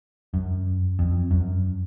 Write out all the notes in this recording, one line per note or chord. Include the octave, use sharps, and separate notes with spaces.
F#2
F2
F#2